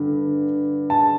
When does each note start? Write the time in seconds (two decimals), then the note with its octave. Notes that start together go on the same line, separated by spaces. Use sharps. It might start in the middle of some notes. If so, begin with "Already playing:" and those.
Already playing: G2 D3
0.90 A5